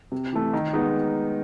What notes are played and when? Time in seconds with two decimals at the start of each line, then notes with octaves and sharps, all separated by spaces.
0.12 C3
0.33 E3 A3
0.53 D#3
0.73 G#3 B3 D#4